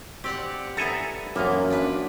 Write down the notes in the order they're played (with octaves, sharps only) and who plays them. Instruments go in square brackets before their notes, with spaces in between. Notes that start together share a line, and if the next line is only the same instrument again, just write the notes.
[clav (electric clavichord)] C4 [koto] G4 D5 F#5
[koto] B3 E4 A#5 [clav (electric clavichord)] A4 G#5
[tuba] F#2 [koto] E3 F3 B3 [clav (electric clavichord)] A#3
[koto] D4 B4